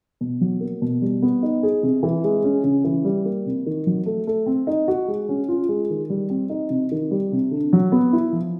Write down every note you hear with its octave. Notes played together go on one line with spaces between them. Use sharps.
B2
F#3
A#3
B2
G3
B3
D#4
G#4
C3
E3
G#3
C#4
C#3
E3
G3
A#3
C3
D#3
F#3
A3
A3
C4
D#4
F#4
G#3
C#4
F4
G#3
D#3
G3
C4
D#4
C3
D#3
G3
C3
D3
F#3
B3
E4
F3